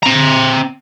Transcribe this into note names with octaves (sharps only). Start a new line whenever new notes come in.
C4 A#5